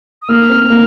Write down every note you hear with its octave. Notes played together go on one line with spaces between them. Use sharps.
D#6
A#3 F6
C4
A#3